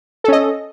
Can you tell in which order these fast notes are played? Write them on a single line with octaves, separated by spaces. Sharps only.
A4 C#4 D#5